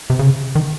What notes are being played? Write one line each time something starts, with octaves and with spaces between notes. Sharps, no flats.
C3
C#3
D#3